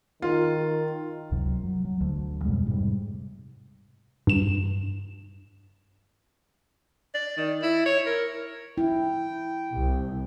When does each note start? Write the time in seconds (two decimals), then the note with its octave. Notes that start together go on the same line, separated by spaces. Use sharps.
0.22 D#3 F4
1.31 C#2 F#2 C3 F#3
1.63 F#3
1.85 F#3
2.01 D2 D3
2.45 F2 B2 G3 G#3
2.66 G#2 C3 G3
4.27 G2 E7
7.15 D5
7.37 D#3
7.62 E4
7.86 C#5
8.06 A#4
8.78 E4 G5
9.73 C2